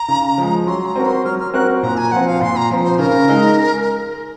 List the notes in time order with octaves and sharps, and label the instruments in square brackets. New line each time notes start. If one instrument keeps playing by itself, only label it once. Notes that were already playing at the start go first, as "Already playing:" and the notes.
Already playing: [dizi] A#5
[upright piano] C#3
F3 G#3
[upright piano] F#3 [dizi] C6
[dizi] A#5
[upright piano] C4 F#4 A#4
[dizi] C6
[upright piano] F#3 [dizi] F6
[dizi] F6
[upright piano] C4 F#4 A#4 [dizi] F#6
[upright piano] A#2 [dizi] A#5
[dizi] G#5
[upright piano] F3 C4 [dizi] F#5
[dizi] F5
[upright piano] A#2 [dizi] C6
[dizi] A#5
[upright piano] F3 C4
[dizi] C5
[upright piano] C#3 [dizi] A#4
[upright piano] G#3 D#4